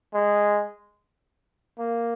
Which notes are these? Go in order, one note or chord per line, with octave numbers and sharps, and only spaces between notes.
G#3
A#3